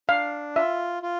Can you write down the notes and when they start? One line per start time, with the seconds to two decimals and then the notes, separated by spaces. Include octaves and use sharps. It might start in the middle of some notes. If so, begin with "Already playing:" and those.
0.09 D4 F5
0.56 F4 E5
1.03 F4